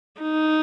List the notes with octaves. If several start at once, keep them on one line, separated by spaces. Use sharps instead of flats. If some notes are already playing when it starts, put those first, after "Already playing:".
D#4